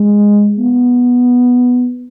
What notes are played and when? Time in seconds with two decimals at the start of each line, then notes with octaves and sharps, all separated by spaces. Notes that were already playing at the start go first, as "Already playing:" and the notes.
Already playing: G#3
0.59 B3